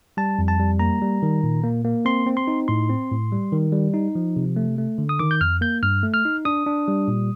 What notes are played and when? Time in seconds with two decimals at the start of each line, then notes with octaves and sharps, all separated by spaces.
0.17 G3 A5
0.39 F2
0.48 A5
0.59 G3
0.79 A#3 A#5
1.02 G3
1.22 D#3
1.43 A#2
1.64 A#3
1.84 A#3
2.05 C4 C6
2.26 C4
2.37 C6
2.48 D#4
2.68 A2 C6
2.89 C4
3.11 A2
3.32 G3
3.53 D#3
3.73 G3
3.94 D#4
4.15 F3
4.36 C3
4.56 A3
4.78 A3
4.98 D3
5.09 D#6
5.19 D#3 D6
5.31 G6
5.41 F2 F6
5.61 A#3 G6
5.83 G2 F6
6.03 A3
6.14 F6
6.25 D#4
6.45 D4 D#6
6.66 D4
6.88 G3
7.08 A#2